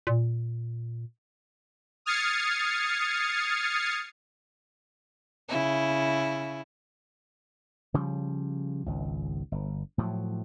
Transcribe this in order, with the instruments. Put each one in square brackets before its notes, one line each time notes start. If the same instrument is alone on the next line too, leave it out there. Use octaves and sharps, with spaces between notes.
[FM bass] A#2
[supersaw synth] D#6 F6 G#6 A6 C7 C#7
[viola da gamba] C#3 E4
[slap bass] C#3 F3 G3
G#1 C#2
G1
A2 F3 F#3